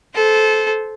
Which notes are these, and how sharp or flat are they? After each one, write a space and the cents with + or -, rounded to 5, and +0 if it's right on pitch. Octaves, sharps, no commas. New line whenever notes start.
A4 -20 C5 -5